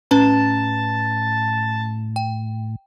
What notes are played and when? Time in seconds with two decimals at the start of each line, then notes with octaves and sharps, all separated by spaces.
0.11 A2 C#4 B4 A5 A#5
2.16 G5